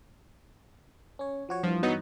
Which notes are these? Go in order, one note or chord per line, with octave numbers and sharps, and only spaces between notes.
C#4 C#5
F3 F#4 C#5
G2 E3 F3
F#3 B3 D#4